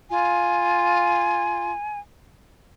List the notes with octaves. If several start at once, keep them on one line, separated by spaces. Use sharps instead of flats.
F4 G#5